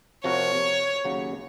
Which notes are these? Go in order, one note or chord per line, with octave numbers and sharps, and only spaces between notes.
C3 F3 C4 F#4 A#4 C#5
D#2 C#3 F#3